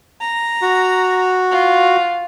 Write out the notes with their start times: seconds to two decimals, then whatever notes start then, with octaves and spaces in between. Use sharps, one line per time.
0.21 A#5
0.62 F#4
1.51 F4